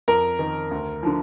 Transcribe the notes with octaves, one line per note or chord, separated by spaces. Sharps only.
F2 A#4
D#3
D2
D3 F3